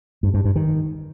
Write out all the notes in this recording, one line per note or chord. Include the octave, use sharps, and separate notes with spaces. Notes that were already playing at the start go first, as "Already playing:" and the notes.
G2
G2
G2
D#3